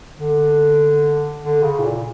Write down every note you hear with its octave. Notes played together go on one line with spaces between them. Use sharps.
D3
D3
C#3
A2
A#2